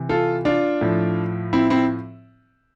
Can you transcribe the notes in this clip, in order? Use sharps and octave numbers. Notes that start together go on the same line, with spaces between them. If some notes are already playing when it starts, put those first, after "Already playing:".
Already playing: C3 E3
F4 A4
D4 F4
A2 F3
C4 E4
C4 E4